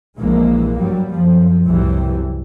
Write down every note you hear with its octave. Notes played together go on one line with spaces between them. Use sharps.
A#1 E3 G#3 A#3
G2 F#3 G3
F#2 F3
C2 F#2 A2 C3 E3 G3